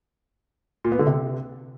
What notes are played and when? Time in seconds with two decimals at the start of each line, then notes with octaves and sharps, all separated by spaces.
0.84 A#2
0.92 B3
0.99 D3
1.07 C3